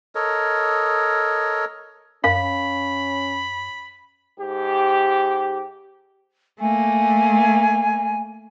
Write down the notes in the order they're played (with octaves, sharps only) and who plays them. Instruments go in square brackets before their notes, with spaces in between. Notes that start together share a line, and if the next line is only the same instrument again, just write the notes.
[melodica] A4 A#4 C#5 D#5
[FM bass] F#2 [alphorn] C#4 [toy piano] F5 [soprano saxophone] B5
[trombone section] G#2 G4
[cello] A3 A#3 [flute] G#5